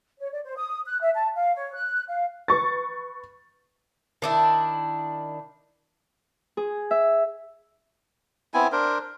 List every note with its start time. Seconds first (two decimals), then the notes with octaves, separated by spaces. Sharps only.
0.20 C#5
0.32 D5
0.44 C5
0.56 D#6
0.86 F#6
1.01 E5
1.15 A5
1.35 F5
1.55 C#5
1.74 F#6
2.08 F5
2.48 B4 C#6 A6
4.22 D#3 D4 E4
6.57 G#4
6.91 E5
8.54 B3 C4 E4 G#5
8.72 D4 A#4 C5